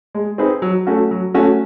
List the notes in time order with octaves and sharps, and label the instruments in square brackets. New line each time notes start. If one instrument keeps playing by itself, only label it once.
[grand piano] G#3
C4 D#4 G#4 B4
F#3
A3 C#4 F#4
F#3
A3 C#4 F#4